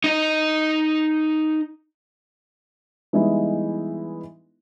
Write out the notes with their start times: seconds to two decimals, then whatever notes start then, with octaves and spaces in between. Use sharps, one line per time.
0.04 D#4 D#5
3.13 E3 G3 G#3 B3 D#4 E4